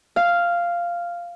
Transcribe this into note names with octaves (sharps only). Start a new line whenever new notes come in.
F5